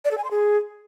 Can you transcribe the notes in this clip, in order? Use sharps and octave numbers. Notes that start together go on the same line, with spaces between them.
D5
A4
G#5
C6
G#4